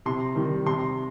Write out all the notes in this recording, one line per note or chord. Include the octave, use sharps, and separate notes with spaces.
C3 C6
D#3 G3
C3 C6